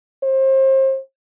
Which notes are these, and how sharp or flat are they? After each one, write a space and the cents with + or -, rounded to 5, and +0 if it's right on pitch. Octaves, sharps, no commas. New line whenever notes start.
C5 +35